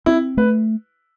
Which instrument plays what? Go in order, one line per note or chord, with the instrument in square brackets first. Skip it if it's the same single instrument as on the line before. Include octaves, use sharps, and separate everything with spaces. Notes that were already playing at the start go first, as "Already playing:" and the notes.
[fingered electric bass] C4 [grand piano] E4
[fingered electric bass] A3 [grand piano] B4